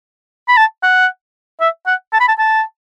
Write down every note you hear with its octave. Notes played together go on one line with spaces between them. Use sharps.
B5
A5
F#5
E5
F#5
A5
B5
A5
A5